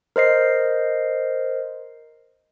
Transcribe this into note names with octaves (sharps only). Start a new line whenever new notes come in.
A#4 C5 D#5 C7